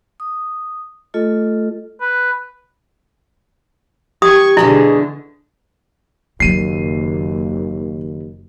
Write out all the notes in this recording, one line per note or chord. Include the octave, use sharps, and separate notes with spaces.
D#6
A3 F4 A4 D#5
B4
E3 G4 C#6 D#6 G#6
B2 D3 E3 G#3 E4 G#4
F#1 D#2 D#3 F#3 C7 D#7